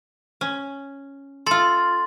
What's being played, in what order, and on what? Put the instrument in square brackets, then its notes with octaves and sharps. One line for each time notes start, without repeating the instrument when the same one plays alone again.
[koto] C#4
[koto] F4 A4 [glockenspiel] C6 A6